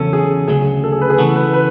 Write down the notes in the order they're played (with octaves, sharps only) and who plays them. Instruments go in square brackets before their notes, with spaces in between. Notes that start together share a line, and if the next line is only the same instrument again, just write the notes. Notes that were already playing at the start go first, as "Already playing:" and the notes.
Already playing: [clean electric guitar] E2 C#3 F#3 C#4 [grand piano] A4
[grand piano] G#4
[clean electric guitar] D2 C#3 F#3 [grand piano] G#4
[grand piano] A4
G#4
B4
G#4
[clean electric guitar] C#3 E3 B3 F#4 [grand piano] A4
[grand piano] B4
B4